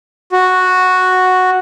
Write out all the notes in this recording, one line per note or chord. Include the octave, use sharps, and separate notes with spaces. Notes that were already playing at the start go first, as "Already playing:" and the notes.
F#4